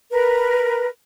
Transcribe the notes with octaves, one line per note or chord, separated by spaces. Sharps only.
A#4 B4